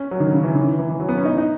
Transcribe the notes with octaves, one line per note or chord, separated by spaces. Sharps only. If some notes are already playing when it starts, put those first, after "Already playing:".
Already playing: C#4
F#3
D#3
C#3
E3
D#3
E3
E3
E3
F#3
B3
C#4
D#4
D#4